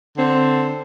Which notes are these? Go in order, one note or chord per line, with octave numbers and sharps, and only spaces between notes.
D3 C4